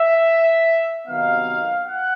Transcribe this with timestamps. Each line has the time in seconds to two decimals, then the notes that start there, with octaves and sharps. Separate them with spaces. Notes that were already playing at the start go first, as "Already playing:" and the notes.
Already playing: E5
1.07 C3 D#3 F#3 B3 D#4 F5
1.85 F#5